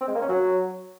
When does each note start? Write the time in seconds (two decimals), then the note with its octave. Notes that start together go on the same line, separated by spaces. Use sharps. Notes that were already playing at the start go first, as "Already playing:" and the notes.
0.01 C4
0.08 G#3
0.15 A#3
0.22 C#4
0.29 F#3